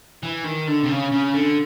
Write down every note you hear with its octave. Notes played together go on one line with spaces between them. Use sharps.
E3
D#3
D3
C3
C#3
C#3
D3